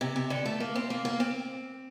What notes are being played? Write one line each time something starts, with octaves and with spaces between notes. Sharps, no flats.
C3
C3
D3
A3
A#3
C4
A#3
A#3
C4